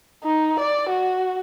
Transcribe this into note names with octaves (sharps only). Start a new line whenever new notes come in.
D#4
D5
F#4